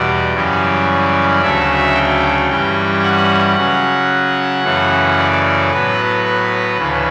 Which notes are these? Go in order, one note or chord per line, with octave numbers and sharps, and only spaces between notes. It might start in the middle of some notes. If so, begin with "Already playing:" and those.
Already playing: E2 B2 G3 D5
F#2 C#3 E3 G3 C#4
D2 C#3 F#3 A3 E5
G5
G2 E3 G3 C#4
F#5
C#3 F#3 C#4
F#2 C#3 E3 A3
D5
A2 F#3 B3 B4
B4
D2 C#3 E3